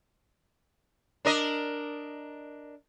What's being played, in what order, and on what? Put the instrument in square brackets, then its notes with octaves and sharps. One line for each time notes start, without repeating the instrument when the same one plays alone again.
[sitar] D4 A#4 D#5